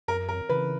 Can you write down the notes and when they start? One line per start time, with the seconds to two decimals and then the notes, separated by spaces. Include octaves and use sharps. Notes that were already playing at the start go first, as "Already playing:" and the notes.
0.08 F#2 A#4
0.29 A#4
0.49 C#3 E3 B4